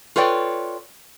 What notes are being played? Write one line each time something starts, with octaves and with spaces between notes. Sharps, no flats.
F4 A4 B4 C#5 D5 G5